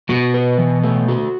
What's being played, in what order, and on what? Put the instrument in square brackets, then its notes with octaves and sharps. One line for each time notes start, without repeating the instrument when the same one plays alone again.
[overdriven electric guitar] B2 [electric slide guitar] F#4
[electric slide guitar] B4
E3
A3
F#4